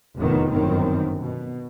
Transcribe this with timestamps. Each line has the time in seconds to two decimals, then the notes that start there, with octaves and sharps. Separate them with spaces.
0.17 F1 E2 A2 D#3 B3
0.51 G1 F#2 D#3 C4
1.19 B2